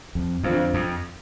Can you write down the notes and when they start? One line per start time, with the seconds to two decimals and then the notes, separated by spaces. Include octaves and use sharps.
0.15 F2
0.44 F2 D3 F3 C4 F4
0.74 F2